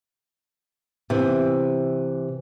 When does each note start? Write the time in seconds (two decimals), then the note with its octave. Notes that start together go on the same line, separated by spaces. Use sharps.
1.10 C3 E3